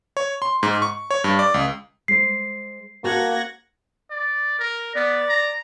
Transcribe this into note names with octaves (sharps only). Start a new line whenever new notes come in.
C#5
C6
G#2
C#6
C#5
G2
D5
C#2
G#3 C5 C7
A#3 F#4 F#5 A5 G#6 A#6
D5
A#4
B3 D5
A#5